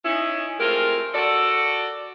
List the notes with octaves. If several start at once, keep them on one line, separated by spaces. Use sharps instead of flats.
C#4 D#4 E4
G#3 A3 C4 F4 G4 A#4
F#4 A4 D5